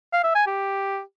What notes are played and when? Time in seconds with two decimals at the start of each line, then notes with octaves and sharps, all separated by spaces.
0.13 F5
0.24 E5
0.35 G#5
0.46 G4